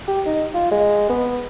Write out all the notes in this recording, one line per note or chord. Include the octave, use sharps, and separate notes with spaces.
G4
D#4
F4
G#3
B3